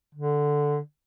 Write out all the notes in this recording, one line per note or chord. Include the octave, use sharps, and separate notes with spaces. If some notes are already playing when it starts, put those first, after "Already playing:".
D3